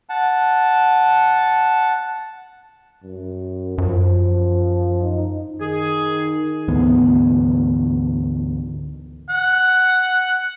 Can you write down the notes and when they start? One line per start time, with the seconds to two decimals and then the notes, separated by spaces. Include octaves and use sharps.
0.09 F#5 A5
3.03 F#2
3.78 F#2 F3
5.02 D#4
5.60 D#3 G#4
6.68 D2 G#2 E3 B3
9.29 F#5